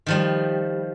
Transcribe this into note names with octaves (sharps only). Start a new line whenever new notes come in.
D#3 F3 G3